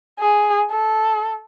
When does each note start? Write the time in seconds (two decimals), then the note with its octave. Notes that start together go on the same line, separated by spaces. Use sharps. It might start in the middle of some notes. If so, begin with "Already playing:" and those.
0.20 G#4
0.71 A4